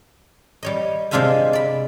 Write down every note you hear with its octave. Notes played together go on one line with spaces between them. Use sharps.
G3 C#5 D#5
C3 G#3 D4 F4 E5 G#5
D5 B5